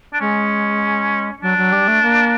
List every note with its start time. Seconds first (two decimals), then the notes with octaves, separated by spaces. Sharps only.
0.13 D4
0.20 G#3 C#4
1.42 F#3 D4
1.58 F#3
1.73 G3
1.88 A3
2.03 A#3